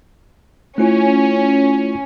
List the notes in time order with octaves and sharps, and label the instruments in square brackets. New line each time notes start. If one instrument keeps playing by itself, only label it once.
[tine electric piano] A3 E4 F4 [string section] C#4